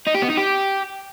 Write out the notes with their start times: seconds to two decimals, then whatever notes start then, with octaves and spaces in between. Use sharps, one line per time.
0.07 D#4
0.15 G4
0.22 B3
0.30 D#4
0.37 G4